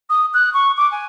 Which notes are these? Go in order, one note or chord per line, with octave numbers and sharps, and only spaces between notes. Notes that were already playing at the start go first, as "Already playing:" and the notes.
D#6
F#6
C#6
D6
G#5